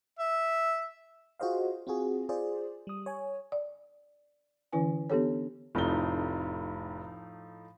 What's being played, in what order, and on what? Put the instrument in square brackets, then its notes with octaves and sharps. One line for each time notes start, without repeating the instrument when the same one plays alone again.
[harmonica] E5
[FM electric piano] F4 F#4 G#4 C5 D#5 F5
C4 F4 F#4 G#4
F4 G#4 C5 D5
G3 D#6
C#5 G#5
[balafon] D5
D3 E3 C#4 E4 B4 G#5
B3 D4 G4 A4 C#5
[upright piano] F1 G7 [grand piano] A2 F3 D#4